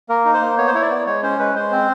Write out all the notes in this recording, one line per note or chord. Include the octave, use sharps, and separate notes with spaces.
A#3 A#4
D#4
C5
A#3
B3 C#5
C5
E4 C#5
D5
B3
G#3 C#5
C#4 C5
G#3 B4
G#3 C5
C4